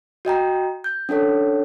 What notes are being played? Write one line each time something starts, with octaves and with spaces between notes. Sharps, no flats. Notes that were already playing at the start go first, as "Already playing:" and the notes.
F#4 D#5 G5 A#5
G6
C#4 D4 A4 C#5